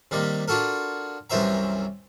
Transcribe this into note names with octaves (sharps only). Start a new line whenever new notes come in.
C3 D#3 G3 A#3
D4 F4 F#4 A4 A#4
C2 F#2 E3 C5 E5 A#5